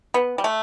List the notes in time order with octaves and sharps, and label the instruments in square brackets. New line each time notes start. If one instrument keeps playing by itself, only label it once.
[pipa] B3
G3
A3